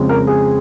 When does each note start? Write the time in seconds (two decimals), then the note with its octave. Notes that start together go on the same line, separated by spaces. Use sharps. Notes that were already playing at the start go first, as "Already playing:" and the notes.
Already playing: F2 C#3 G#3
0.09 A#4
0.27 G#4